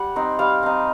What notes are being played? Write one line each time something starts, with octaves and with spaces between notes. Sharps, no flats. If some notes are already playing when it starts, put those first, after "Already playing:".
Already playing: G3 F#5
C4 D#4
G3 F5
C4 D#4